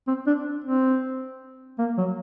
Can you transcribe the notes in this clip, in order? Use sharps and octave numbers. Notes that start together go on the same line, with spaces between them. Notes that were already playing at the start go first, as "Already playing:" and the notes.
C4
D4
C4
A#3
F#3